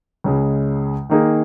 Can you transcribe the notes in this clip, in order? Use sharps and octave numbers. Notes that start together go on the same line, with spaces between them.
C#2 C#3 G#3
D#3 A#3 D#4 G#4